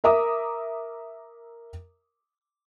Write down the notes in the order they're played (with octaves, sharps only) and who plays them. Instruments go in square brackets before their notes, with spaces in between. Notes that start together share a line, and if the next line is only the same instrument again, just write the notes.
[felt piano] A#4 E5 A#5 D6 D#6